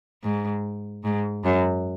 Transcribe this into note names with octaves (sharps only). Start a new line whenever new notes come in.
G#2
G#2
F#2